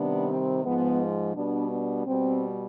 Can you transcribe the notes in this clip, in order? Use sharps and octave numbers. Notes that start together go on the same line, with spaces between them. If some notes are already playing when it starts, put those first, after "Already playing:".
Already playing: C3 D#3 G3 B3 D4
C4
G#2 F3 G#3 B3
B2 G3 B3 D4
B3 D4
B2 G3 C4